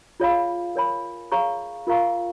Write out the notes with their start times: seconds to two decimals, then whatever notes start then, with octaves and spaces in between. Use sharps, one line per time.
0.20 F4 G#4 C#5 F5 B5
0.76 A#4 C#5 G#5 B5
1.32 G#4 C#5 F5 A#5 C#6
1.87 F4 A#4 F5 A#5 C#6